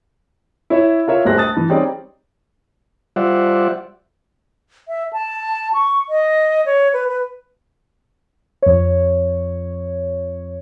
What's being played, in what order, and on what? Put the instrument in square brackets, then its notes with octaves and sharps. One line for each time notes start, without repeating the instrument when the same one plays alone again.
[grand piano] E4 C#5 E5
F4 A#4 C#5 E5
D1 A#1 G3 C5 F#6 A#6
A5 D#6 A6
E3
G3 C4 C#4 D#4 G#4 D5
[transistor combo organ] G3 F4 C5 D5 E5 F#5
[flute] E5
A5
C#6
D#5
C#5
B4
B4
[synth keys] F2 C#5